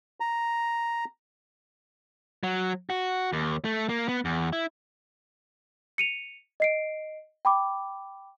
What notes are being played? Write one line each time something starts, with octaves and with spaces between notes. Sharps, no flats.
A#5
F#3
F#4
D#2
A3
A#3
B3
E2
E4
C#7 D#7 F7
D#5 C7 D7
G5 B5 D6